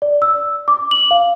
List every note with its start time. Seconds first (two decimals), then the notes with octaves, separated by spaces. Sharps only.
0.02 D5
0.22 E6
0.68 D6
0.91 F#7
1.11 F5